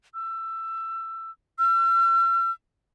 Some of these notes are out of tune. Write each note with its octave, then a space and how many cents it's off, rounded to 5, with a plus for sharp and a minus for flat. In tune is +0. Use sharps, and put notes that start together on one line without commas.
E6 +20
E6 +45